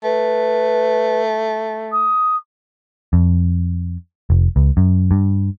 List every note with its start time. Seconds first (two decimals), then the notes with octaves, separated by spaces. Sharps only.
0.04 A3 B4
1.92 D#6
3.13 F2
4.30 F1
4.56 C#2
4.77 F#2
5.11 G2